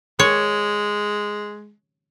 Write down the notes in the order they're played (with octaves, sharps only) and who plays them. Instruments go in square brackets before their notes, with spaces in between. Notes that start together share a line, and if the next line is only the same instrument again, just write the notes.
[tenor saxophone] G#3 [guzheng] C#5